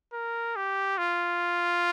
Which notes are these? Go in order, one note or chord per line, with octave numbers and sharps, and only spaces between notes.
A#4
G4
F4